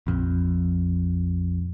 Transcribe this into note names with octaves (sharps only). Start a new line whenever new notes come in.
A#1 F2